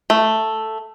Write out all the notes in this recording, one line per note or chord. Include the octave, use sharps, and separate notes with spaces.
A3